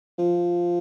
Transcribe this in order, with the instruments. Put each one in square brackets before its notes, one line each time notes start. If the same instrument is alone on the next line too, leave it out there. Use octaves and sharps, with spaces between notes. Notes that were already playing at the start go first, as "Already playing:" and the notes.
[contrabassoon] F3